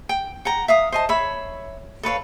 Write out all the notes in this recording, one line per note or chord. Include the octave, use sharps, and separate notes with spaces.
G5
F#5 G5 A#5
E5 F5 D#6
C5 D#5 A5
C#5 E5 B5
A4 B4 C#5 F5